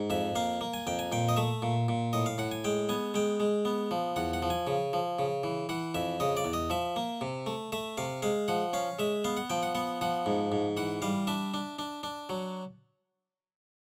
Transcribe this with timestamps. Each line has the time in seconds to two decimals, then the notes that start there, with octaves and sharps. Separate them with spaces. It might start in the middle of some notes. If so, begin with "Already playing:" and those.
Already playing: G#2
0.10 F2 E5
0.35 A#3 F5
0.61 A#3
0.74 G#5
0.87 F2 G5
0.99 G#5
1.12 A#2 G5
1.29 D#5
1.36 A3 E5
1.62 A#2
1.88 A#2
2.13 A2 D#5
2.26 F5
2.38 A2 F#5
2.52 G#5
2.64 G#3 G5
2.89 B3 G#5
3.14 G#3 G5
3.40 G#3
3.65 B3
3.91 F3
4.16 E2 F#5
4.33 F#5
4.42 F3
4.50 G#5
4.67 C#3
4.93 F3
5.19 C#3
5.43 E3
5.69 E3 F#5
5.95 F2 E5
6.20 C#3 D#5
6.37 D5
6.45 E2
6.53 D#5
6.70 F3 E5
6.96 A#3
7.21 C3
7.46 A3
7.72 A3 E5
7.97 C3 F5
8.22 G#3 F5
8.48 F3 F#5
8.73 C#4 F5
8.99 G#3 E5
9.24 B3 F5
9.37 F#5
9.50 F3 G5
9.63 F#5
9.75 B3 F#5
10.01 F3 F#5
10.26 G#2
10.52 G#2
10.77 E3 F#5
11.02 G3 F5
11.27 D4 E5
11.54 D4
11.79 D4
12.03 D4
12.29 F#3